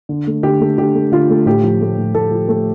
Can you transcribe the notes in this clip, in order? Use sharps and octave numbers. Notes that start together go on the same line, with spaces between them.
D3
A3
D3 G4
A3
D3 G4
A3
D3 F4
A3
A2 G4
F3
A3
A2
A2 A4
F3
A3 A4